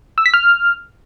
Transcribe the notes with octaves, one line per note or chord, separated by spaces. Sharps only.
E6
B6
F6